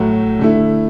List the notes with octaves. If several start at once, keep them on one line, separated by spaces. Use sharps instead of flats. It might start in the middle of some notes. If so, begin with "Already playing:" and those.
Already playing: A2 F#3 A3
D3 A3 E4